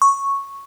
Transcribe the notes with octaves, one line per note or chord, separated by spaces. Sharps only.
C#6